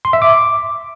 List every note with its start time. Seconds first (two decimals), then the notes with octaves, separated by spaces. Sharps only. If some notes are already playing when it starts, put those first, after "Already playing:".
0.05 C6
0.13 E5
0.22 D6